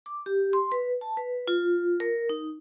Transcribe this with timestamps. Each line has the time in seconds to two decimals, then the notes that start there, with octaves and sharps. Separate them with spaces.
0.06 D6
0.26 G4
0.53 C6
0.72 B4
1.01 A5
1.17 B4
1.48 F4
2.00 A#4
2.29 D#4